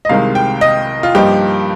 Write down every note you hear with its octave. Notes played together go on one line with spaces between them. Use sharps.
D#5
C2 C3 D#3 G#3 F5
G5
D#5
F4
G2 F3 A#3 D#4 G4